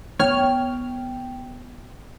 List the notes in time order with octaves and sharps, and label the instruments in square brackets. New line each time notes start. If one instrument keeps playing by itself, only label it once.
[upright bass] B3 [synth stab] C#5 F6 [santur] G5